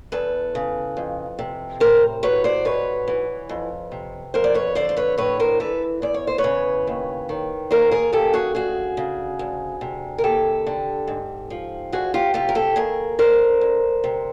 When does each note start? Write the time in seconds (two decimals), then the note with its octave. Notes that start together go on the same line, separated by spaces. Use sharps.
0.12 E2 A4 B4
0.55 C#3
0.97 F2
1.39 C3
1.80 A2 A#4 C5
2.23 F#3 B4 C#5
2.44 C5 D5
2.65 G#2 B4 C#5
3.08 E3
3.49 F2
3.92 C3
4.34 F2 A#4 C5
4.44 D5
4.54 B4 C#5
4.75 D3 C5 D5
4.89 C5
4.97 B4 C#5
5.18 A2 B4 C#5
5.40 A#4 C5
5.60 E3 A4 B4
6.02 E2 D5
6.14 C#5
6.27 C5
6.38 B4 C#5
6.44 C#3
6.87 D#2
7.29 D#3
7.71 D#2 A#4 C5
7.91 G#4 A#4
8.13 C#3 G4 A4
8.34 F#4 G#4
8.55 D2 F#4 G#4
8.97 C#3
9.39 D2
9.81 C3
10.18 A#4
10.24 D#2 G4 A4
10.67 D3
11.07 G#2
11.50 F3
11.93 D2 F#4 G#4
12.14 F4 G4
12.34 C3 F4 G4
12.49 A#4
12.55 G4 A4
12.76 D#2 G#4 A#4
13.19 D3 A#4 C5
13.61 D2
14.04 C3